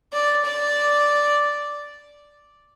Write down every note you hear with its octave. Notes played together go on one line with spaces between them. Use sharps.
D5
D5